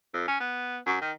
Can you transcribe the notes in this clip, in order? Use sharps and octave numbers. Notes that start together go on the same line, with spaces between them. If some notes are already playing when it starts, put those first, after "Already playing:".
F2
C#4
B3
F#2
D#3